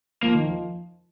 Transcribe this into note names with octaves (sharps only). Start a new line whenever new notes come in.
F3 A#3
D#3
F3